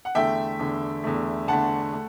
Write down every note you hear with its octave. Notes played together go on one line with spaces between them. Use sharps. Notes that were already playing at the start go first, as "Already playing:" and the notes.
F#5
E2 D3 A3 E5 G5
E2 D3 A3
E2 D3 A3
E2 D3 A3 F#5 A5
A3